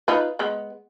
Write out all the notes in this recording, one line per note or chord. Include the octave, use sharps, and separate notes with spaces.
D#4 F4 B4
G#3 B3